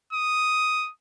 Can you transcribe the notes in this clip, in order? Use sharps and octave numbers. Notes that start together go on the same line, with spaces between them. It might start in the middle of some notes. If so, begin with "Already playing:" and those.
D#6